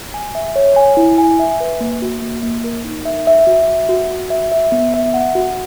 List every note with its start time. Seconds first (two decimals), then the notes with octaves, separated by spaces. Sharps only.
0.14 G#5
0.35 E5
0.56 C#5
0.76 G#5
0.97 E4
1.18 G#5
1.39 E5
1.60 B4
1.81 A#3
2.02 F#4
2.22 A#3
2.43 A#3
2.64 A#4
2.84 D#4
3.05 E5
3.27 E5
3.47 F#4
3.68 E5
3.89 F#4
4.10 F#4
4.30 E5
4.52 E5
4.72 B3
4.94 E5
5.14 F#5
5.35 F#4